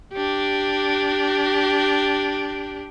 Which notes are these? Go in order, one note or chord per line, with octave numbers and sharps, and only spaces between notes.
D4 G4